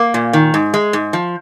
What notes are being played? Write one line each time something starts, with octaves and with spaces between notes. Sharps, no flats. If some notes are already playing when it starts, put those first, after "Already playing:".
Already playing: A#3
A#2
D#3
G#2
G#3
G#2
F3